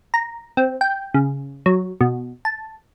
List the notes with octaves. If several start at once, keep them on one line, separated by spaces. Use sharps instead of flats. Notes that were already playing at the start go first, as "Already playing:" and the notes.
A#5
C4
G5
C#3
F#3
B2
A5